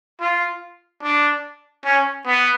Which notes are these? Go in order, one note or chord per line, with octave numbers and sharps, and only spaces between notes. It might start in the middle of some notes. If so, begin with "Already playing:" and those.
F4
D4
C#4
B3